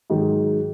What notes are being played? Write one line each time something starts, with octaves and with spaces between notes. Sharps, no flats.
G#2 D#3 F#3